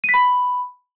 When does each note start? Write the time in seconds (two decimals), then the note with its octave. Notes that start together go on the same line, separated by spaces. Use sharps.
0.04 D#7
0.09 B6
0.14 B5